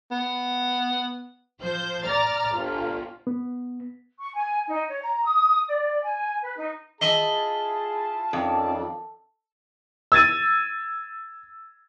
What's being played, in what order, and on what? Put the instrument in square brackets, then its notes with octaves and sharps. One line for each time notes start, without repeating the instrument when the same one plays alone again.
[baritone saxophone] B3
[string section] F3 C5 G6
D5 A#5 F6 A6
G1 F4
[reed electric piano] B3
[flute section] C#6
G#5
D#4
C#5
A#5
D#6
D5
G#5
B4
D#4
[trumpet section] E4 F4 A5 [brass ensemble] G#4 [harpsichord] D#5 E5 B5
[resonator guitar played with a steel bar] F2 [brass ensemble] D#3 C#4 D5
[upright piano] E6 G#6 A6 D#7